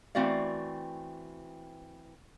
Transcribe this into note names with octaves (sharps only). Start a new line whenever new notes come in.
E3 A3 C4 F#4 D5 F5